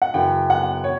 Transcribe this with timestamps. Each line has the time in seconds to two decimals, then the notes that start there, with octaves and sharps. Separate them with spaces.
0.02 F#5
0.14 F#2 C#3 E3 G5
0.50 F#5
0.84 C#5